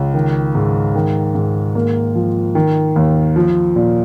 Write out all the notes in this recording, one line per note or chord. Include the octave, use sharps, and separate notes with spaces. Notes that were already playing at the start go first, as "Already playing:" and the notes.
Already playing: C#2
D#3
G#2
D#3
G#2
A#3
F3
D#3
D#2
F3
A#2